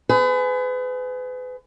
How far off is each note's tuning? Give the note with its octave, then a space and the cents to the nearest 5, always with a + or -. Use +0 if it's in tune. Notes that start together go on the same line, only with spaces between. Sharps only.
G#4 +15 B4 +35